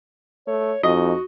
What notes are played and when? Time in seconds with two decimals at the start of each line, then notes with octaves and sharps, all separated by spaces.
0.47 A3 C#5
0.83 F2 D#4 F#4 D#5